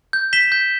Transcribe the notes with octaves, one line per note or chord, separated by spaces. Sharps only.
G6
B6 E7 G7
G6